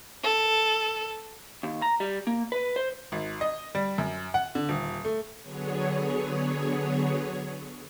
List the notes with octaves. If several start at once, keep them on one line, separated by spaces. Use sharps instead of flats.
A4
D#2
A#5
G3
A#3
B4
C5
G#1
D#5
G3
F#2
F#5
D3
D#1
A3
D3 F#3 B3 G#4 C#5